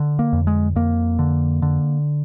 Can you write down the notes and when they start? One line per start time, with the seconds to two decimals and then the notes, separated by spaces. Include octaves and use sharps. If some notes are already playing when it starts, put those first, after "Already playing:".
Already playing: D3
0.19 A#3
0.33 F2
0.47 G#3
0.76 F2 A#3
1.19 D3
1.62 D3